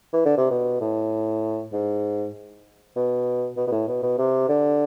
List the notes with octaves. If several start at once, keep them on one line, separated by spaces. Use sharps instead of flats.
E3
D3
C3
B2
A2
G#2
B2
B2
B2
A2
B2
B2
C3
D3